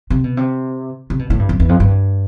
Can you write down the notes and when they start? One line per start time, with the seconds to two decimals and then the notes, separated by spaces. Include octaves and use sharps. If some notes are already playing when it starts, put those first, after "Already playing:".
0.10 C3
0.24 B2
0.37 C3
1.10 C3
1.19 B2
1.30 A2
1.39 G2
1.49 F2
1.60 E2
1.69 F2
1.80 G2